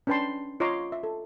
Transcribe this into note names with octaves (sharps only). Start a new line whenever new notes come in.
C#4 D4 B4 G5 A5 C6
F4 C#5 D#5 A#5 C6 D6
E5
A4